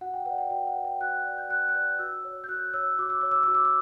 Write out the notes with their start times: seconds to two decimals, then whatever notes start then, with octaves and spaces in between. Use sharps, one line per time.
0.01 F#4 F#5
0.14 G5
0.26 B4 D5 F#5
0.38 G5
0.50 F#4 G5
0.67 F#5
0.76 B4 D5
0.84 G5
1.01 F#4 F#6
1.25 B4 D5
1.38 G6
1.49 F#4 F#6
1.69 F#6
1.74 B4 D5 G6
1.99 F#4 E6
2.25 C#5
2.44 G6
2.48 F#4 F#6
2.74 C#5 E6
2.99 F#4 D6
3.10 E6
3.21 C#5 D6
3.32 E6
3.43 F#4 D6
3.55 E6
3.65 D6